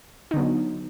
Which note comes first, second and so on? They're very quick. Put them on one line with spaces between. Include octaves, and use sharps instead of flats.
D#4 D3 B3 F#3